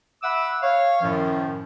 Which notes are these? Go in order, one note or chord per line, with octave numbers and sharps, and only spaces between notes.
E5 F#5 B5 D6 E6
C#5 F5
F#2 A2 D#3 F3